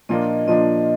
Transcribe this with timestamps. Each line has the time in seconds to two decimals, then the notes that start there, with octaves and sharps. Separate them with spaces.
0.09 A#2 F3 A#3 D4 D#5
0.47 A#2 F3 A#3 D4 D#5